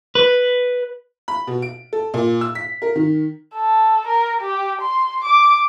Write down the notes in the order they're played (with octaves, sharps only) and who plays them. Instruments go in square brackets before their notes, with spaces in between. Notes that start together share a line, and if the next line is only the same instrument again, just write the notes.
[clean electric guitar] B4
[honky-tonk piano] B5
B2
D7
A4
A#2
E6
B6
A#4
D#3
[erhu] A4
A#4
G4
C6
D6